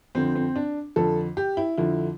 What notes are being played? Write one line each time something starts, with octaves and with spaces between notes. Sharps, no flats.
F2 D3 F3 C4
C4
D4
F2 D3 F3 A4
G4
E4
F2 D3 F3 E4